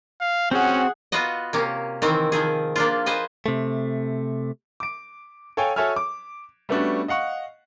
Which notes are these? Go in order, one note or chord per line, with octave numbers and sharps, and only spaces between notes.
F5
C4 C#4 F#4 G#4 F#5
B3 F4 F#4 B4 D#5
C3 A#3 C#4
D#3 E3 C4
D#3 F3 G#4
A#3 D4 F4
B4 C5 D#5 G#5
C3 A3
D6 D7
A4 C#5 F5 G5 G#5
F#4 A4 C#5 E5 G#5 F6
D6
G3 A3 B3 C#4 D4 F#4
D#5 F5 F#5 C#6